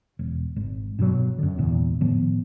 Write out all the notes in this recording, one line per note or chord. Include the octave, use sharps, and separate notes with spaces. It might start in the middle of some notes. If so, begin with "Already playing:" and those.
E1
G#1
G2 B2 D3 F#3
F#2 D3
G#1 E2 A#2
A2 D#3 F3 B3